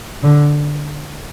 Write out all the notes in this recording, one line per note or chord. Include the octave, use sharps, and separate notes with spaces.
D3